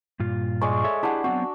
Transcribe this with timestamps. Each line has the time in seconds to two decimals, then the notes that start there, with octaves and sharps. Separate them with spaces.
0.20 G2 A#2 F4
0.61 G#3 D5 C#6
0.84 A4 C#5 E5
1.03 D4 E4 G4 G#4 F#5
1.24 F#3 B3 C4 F#4 E5